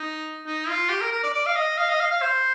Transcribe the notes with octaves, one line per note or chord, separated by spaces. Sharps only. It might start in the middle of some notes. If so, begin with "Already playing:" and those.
Already playing: D#4
D#4
F4
G4
A#4
A#4
D5
D5
F5
D#5
F5
D#5
F5
F5
C5